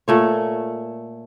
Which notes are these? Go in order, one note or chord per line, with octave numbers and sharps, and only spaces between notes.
A#2 A3 C#5